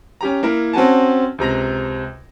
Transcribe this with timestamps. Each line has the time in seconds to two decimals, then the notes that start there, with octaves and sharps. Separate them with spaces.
0.21 C#4 G4 A#5
0.43 A#3 E4 A#4
0.73 C4 C#4 F#4 G#5 A5
1.38 C#2 C3 A#5 A#6